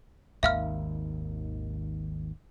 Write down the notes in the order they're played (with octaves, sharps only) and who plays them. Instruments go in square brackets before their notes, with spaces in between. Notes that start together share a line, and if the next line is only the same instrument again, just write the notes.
[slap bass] G#1 D#2 D#3 [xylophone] E5 F5 F6